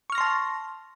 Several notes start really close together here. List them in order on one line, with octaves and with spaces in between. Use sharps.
C#6 F6 A#6 C6 A5